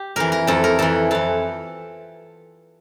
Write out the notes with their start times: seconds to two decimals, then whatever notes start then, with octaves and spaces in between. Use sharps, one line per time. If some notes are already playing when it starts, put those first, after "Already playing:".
Already playing: G4
0.16 F2 E3 A#4
0.32 A#4
0.47 F2 E3 A4
0.64 A#4
0.79 F2 E3 A4
1.11 F2 E3 A4